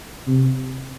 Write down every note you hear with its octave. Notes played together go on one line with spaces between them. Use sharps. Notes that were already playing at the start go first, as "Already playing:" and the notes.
C3